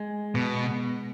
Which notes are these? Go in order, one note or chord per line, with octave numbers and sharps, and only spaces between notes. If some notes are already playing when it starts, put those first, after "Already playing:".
Already playing: G#3
B2